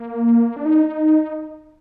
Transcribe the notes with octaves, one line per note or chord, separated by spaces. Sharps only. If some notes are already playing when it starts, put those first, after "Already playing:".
Already playing: A#3
D4
D#4